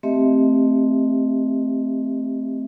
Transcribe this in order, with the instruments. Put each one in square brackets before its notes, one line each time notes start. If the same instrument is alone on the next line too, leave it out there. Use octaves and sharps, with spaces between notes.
[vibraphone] A3 C4 G4 D#5 E5